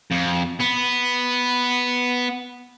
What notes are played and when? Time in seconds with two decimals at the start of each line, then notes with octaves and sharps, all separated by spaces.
0.11 F2
0.60 B3